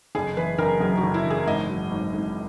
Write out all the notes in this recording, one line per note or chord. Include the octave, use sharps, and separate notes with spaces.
F#1 G#4
E3 B4
F#1 A#4
F#2 G#4
F#4
F#1
E4
E3
G#4
G#1 D#5
F#3
G#1
G#2